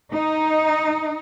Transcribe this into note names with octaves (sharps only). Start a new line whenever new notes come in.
D#4